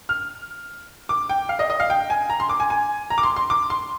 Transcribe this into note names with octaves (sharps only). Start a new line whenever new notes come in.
F6
D6
G5
F5
D#5
D#5
F5
G5
G#5
A#5
C6
D6
G#5
G#5
A#5
D6
C6
C6
D6
C6